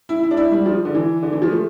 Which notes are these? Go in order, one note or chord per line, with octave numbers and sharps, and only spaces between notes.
E4
E4
D4
E4
G3
F3
D3
E3
D3
E3
F3
A3